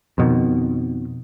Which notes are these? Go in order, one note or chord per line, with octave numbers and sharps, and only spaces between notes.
F2 B2 D#3